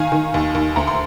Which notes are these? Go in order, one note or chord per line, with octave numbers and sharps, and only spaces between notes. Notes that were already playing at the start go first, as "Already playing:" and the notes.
Already playing: D#3 F5 G#5
D#3
D#2
D#2
D2 A#5
C6